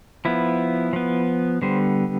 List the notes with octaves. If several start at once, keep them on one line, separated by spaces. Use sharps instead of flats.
F3 B3 E4
F3 B3
D3 G3 B3 C5